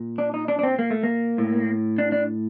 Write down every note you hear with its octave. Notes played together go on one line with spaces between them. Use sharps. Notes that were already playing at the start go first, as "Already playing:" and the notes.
Already playing: A#2
D4
D#4
D4
D4
C4
A#3
A3
A#3
A2
D4
D4